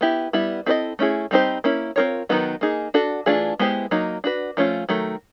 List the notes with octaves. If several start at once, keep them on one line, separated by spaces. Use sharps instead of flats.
B3 E4 G4
G3 B3 E4
C4 E4 A4 C5 D#5
A3 C#4 E4 G#4
G3 C4 D#4 G4 C5
A#3 C#4 E4
C4 F4 A#4 C#5
D#3 F#3 B3 D#4
A#3 D#4 G#4
D4 F#4 A4
E3 A3 D4 F4 G#4
G#3 B3 E4 G4 C5
F#3 A#3 D#4
D4 F#4 B4
F3 A3 C#4 F4
D#3 F#3 A3